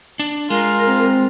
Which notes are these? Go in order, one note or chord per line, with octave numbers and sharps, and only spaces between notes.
D4
G#3 F4 A#4
C4